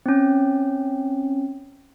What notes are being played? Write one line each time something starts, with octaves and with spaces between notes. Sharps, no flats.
C4 C#4